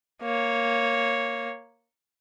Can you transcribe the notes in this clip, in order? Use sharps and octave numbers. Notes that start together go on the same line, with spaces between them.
A#3 C#5